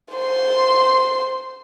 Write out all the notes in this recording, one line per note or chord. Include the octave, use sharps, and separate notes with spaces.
C5 C6